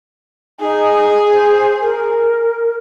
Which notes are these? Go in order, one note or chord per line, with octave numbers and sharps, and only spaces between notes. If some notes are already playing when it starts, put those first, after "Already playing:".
D#4 G#4
C5
A#4